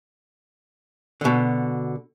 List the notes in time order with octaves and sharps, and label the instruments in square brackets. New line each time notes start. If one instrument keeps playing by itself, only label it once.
[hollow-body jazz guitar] B2 D3